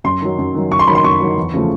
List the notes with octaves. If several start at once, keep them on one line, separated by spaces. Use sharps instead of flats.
F#2 C6
D#3 F#3
F#2
D#3 F#3
F#2 C#6
C6
D#3 F#3 B5
C6
F#2 C#6
D#3 F#3
E2
C#3 F3 A3